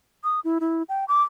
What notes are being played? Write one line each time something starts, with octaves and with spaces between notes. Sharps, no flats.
D#6
E4
E4
G5
D6